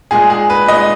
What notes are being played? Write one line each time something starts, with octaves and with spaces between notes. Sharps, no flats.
A#2 G#3 G#4
G#4
B4
A#2 G#3 D#5